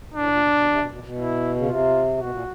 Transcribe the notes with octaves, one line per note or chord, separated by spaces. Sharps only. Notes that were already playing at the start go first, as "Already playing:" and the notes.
A2 D4
A#2
B2
B2
C3
B2
B2
B2
E4
C#3
C3 F4
B2 F#4
A#2